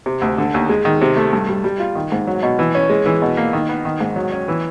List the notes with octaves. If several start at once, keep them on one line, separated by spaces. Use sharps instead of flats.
C3
D2
D3
D#2
G#3
D#3
C3
A3
G2
G3
G3
F4
D#3
G#2
F#3
B2
E3
C#4
G#3
E3
B2
A#3
D#3
B3
D#3
G#2
F#3
C#4
E3